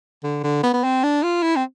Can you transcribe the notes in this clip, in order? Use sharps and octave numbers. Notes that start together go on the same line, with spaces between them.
D3
D3
B3
B3
C4
D4
F4
E4
C4